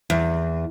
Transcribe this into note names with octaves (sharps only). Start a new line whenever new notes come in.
E2